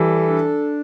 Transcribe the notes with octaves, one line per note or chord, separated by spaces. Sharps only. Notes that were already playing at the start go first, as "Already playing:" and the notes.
Already playing: E3 G3 A4
D4